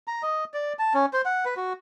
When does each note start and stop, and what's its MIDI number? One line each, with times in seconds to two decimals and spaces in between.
0.08 0.22 82
0.23 0.44 75
0.54 0.73 74
0.79 0.93 81
0.94 1.06 61
1.13 1.22 72
1.25 1.45 78
1.45 1.55 71
1.57 1.73 66